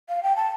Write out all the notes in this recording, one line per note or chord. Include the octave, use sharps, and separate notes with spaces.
F5
G5
A5